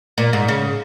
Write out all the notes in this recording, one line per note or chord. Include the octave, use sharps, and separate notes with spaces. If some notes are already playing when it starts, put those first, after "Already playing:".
A#2
G#2
C#3